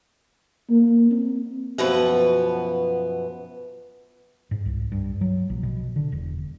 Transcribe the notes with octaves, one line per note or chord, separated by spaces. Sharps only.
A#3
C4
F#2 B2 F3 B3 B4
G#2
C2
G2
F#3
A#1
B2
D3
E1